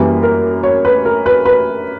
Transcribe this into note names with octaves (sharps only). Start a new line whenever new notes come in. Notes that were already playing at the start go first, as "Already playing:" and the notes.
Already playing: F#2 E3 G3 A#3 B4
A#4
C#5
B4
A#4
B4
B4